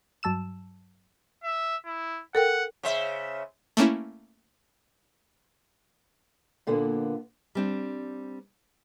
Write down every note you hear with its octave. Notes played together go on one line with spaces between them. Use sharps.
G2 F#3 A5 E6 E7
E5
E4
A4 A#4 F#5 G5
C#3 C5 E5
A3 A#3 C#4 E4
A#2 D3 A#3 B3
G3 C4 D4